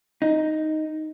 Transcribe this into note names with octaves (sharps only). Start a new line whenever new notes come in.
D#4